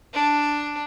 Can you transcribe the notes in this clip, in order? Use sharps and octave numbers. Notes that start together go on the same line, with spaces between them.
D4